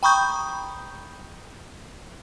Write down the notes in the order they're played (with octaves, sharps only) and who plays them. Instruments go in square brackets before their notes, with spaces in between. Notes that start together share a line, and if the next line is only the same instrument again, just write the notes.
[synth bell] G5 A#5 B5 C#6 D#6 G6